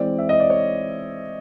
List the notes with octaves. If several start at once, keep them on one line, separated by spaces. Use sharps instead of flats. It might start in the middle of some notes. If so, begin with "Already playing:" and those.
Already playing: E3 G#3 C4 D5
E5
D#5
D5
C#5